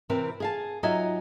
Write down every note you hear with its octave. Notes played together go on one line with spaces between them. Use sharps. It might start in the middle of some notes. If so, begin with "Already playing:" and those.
C3 E3 C4 A#4 B4
G#4 F5 A5
F#3 D#4 F4 D#5 E5 G#5